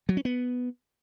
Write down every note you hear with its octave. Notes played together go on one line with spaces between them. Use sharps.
F#3
C#4
B3